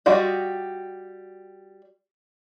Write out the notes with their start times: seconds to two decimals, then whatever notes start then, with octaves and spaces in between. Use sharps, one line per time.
0.06 G3 F4 F#4 D5 D#5